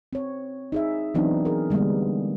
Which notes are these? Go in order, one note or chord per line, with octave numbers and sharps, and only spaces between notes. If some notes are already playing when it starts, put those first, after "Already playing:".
C4 C#5
D#4 G#4 E5
E3 F#3 B3 C4 D4 D#4
G#4 A#4
D3 G3 G#3 A#3 B3